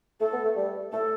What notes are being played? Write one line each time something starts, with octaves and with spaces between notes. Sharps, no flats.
A3 A4
B3
A3
G3
A3 A4